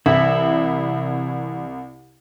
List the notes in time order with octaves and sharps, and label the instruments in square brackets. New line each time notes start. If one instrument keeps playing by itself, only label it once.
[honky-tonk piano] C2 [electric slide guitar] E3 E4